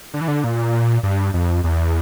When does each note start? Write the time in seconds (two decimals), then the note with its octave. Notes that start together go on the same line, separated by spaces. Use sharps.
0.14 D3
0.21 E3
0.28 D3
0.44 A#2
1.03 G2
1.34 F2
1.64 E2